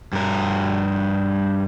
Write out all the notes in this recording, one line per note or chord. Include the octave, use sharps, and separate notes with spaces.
G2 A#4